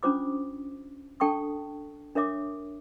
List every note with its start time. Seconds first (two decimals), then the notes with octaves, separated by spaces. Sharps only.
0.03 C#4 D4 F4 C5 D6 D#6
1.20 D4 A4 G5 A5 C#6 D#6
2.15 D4 A#4 C#5 E5 D6 D#6